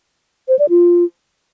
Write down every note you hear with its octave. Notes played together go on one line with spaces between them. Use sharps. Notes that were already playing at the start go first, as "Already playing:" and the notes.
C5
D5
F4